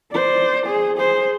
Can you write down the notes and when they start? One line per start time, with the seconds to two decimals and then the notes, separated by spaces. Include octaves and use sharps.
0.12 C5 D5
0.66 G#4
0.98 G#4 C5